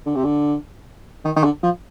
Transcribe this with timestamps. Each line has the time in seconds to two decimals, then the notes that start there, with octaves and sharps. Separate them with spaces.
0.06 D3
0.15 C3
0.24 D3
1.25 D#3
1.36 D#3
1.44 D3
1.63 F3